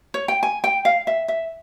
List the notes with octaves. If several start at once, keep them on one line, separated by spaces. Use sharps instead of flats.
C#5
G5
G#5
G5
F5
E5
E5